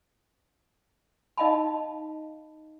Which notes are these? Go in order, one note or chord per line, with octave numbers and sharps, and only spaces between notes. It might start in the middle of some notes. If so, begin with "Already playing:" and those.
D#4 D#5 F5 A5 B5